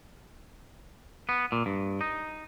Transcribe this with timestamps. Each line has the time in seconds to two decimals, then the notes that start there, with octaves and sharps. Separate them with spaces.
1.29 B3
1.52 A#2
1.66 G2
2.01 D#4